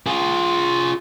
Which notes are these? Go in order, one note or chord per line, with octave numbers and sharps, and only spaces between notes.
F4 G#4